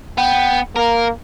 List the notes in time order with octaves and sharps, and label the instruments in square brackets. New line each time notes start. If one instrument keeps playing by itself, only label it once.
[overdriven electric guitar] B3 [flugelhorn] G5
[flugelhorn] A#3 [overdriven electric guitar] A#4